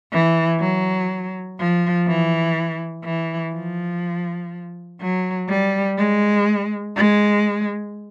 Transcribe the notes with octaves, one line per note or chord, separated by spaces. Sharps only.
E3
F#3
F3
E3
E3
F3
F#3
G3
G#3
G#3